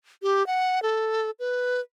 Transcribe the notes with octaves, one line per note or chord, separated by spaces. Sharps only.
G4
F#5
A4
B4